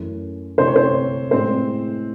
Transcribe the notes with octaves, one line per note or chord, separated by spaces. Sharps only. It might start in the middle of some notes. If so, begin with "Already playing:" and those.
Already playing: F#2 E3 A3
C3 E3 A3 C5
C#5
C4 C5
A2 G#3 C4 C5